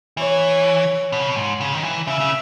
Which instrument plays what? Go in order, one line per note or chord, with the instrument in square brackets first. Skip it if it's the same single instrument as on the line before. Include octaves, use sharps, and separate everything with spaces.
[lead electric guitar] E3 [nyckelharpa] C#5
[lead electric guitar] B2
C#3
B2
G#2
C#3
D#3
E3
[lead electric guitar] C#3 [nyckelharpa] E5
[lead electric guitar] C#3